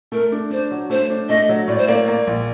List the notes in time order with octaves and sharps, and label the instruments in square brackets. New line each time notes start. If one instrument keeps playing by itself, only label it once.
[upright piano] A3 [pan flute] A#4
[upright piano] D4
[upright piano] D4 [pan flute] C5
[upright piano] F#3
[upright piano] A3 [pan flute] C5
[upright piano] D4
[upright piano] A3 [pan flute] D#5
[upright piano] F#3
[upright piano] A2 [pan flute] D5
[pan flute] C5
[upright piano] A#3 [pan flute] D5
[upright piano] A#3 [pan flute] D5
[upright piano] A#1